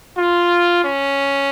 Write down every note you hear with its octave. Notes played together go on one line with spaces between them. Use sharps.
F4
C#4